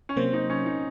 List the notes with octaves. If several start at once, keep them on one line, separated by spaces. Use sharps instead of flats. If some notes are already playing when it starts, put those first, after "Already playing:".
C#4
C3 F#3 A#3 C4
D#4
C#4
D#4